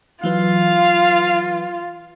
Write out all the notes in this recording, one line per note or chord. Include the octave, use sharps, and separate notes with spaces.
E3 F#3 F4 B4 F5